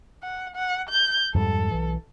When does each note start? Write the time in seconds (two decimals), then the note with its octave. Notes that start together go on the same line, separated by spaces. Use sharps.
0.23 F#5
0.56 F#5
0.89 G6
1.34 F2 G#2 G3 A4
1.71 B1 E3